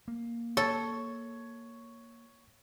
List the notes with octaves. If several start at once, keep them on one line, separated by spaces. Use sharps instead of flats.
A#3
A4 C#5